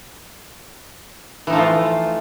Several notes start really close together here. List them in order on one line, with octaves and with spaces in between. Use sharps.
E3 D#4 F3 A3 F4